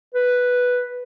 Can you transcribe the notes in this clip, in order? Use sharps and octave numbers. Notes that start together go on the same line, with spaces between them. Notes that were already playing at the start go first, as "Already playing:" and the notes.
B4